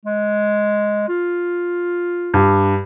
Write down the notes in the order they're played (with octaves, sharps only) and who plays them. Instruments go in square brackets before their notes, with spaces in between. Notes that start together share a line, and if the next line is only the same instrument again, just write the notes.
[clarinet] G#3
F4
[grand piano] G2